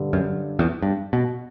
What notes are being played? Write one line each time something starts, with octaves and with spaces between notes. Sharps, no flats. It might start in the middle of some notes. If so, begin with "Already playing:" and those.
Already playing: G2 D3 G3
F#2
E2
G2
B2